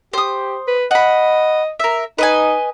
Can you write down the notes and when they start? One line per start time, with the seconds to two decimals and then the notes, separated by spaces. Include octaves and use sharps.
0.13 G4 C5 D#6
0.68 B4
0.91 D#5 F#5 B5
1.80 A#4 E5
2.18 D#4 B4 D#5 G#5